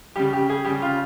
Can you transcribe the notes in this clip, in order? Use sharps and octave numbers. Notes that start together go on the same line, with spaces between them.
C#3 G3 G4
G4
G#4
C#3 G3 G4
F4